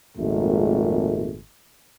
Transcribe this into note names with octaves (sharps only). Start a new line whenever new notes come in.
G#1 F2 A#2 G#3 A3